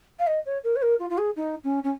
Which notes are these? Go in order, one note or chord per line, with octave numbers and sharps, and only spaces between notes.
F5
D#5
C#5
A#4
C#5
A#4
F4
F4
G#4
D#4
C#4
C#4